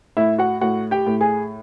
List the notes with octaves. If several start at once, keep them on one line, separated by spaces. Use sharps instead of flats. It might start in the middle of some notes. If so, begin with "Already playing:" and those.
A2 E4 E5
F#4 F#5
A2 F#4 F#5
G4 G5
A2
G#4 G#5